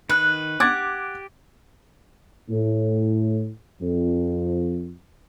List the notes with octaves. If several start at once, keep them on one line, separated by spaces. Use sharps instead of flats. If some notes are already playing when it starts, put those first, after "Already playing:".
D#3 B4 F#6
G4 F#5 D6 G#6 A6
A2
F2